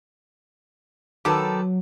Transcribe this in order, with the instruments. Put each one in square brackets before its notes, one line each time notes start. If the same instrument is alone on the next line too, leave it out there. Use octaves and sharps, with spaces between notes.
[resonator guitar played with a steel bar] D#3 A4 [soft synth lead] F#3 [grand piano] B4 A5 D6